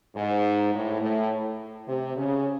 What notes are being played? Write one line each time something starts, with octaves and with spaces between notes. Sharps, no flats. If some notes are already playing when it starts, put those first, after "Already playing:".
G#2
A2
A2
C3
C#3